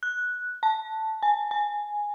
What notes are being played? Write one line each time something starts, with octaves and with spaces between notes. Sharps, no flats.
F#6
A5
G#5
G#5